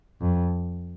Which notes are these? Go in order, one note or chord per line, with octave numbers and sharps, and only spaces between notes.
F2